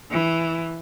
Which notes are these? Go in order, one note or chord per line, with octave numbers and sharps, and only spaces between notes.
E3